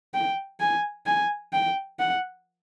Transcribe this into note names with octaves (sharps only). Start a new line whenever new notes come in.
G5
G#5
G#5
G5
F#5